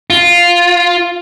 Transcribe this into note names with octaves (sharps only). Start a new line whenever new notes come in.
F4